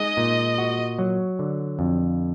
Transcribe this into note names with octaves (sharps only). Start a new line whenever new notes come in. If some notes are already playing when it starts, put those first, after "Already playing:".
Already playing: G#3 D#4 D#5
A#2
F#4
F#3
D3
F2